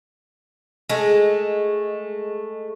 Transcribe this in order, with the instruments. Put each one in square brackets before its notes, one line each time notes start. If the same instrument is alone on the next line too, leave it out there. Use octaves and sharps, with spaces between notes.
[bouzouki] G#3 A3